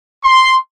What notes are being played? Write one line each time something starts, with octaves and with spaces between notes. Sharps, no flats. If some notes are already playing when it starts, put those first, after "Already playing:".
C6